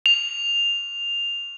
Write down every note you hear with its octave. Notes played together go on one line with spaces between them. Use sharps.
F7